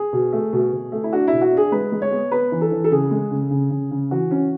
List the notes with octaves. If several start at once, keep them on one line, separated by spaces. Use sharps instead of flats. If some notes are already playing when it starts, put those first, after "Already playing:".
Already playing: G#4
B2
A3
B2
B2
A3
E4
D4 F#4
B2 E4
F#4
D4 G#4
G#3 B4
G#3
C#5
B3
B3 B4
E3
A4
E3
A4
C#3 G#4
G#3
C#3
C#3
C#3
C#3
E3 F#4
C#4